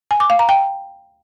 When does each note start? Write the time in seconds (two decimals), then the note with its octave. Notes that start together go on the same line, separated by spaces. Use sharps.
0.11 G#5
0.20 D6
0.30 F5
0.39 A#5
0.49 G5